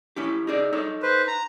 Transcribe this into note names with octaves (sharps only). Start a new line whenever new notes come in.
C#4 E4 G4
D#4 G#4 D5
D#4 A4 C#5
B4 C5
A#5